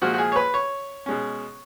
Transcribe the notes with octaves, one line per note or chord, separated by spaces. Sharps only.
A#2 F3 G#3 F#4
F#4
G#4
C#5
B4
C#5
B2 G#3 C#4